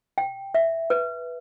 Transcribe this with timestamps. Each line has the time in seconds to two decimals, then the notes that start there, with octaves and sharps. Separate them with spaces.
0.18 G5
0.54 E5
0.90 B4